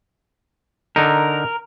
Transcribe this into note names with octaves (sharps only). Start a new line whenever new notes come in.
D3 D#4 A#4